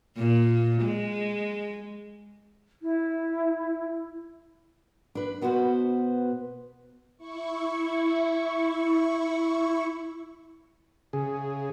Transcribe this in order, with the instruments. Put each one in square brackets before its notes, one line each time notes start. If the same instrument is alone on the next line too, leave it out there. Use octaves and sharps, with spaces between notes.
[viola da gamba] A#2
G#3
[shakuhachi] E4
[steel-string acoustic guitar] D4 B4
B2 B3 F#4 B4 C5
[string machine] E4 C#6
[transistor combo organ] C#3 G#4